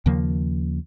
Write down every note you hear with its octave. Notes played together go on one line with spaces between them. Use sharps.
D#2 C#3 F3 A#3